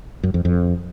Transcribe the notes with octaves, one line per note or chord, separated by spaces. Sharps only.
F#2
F2
F2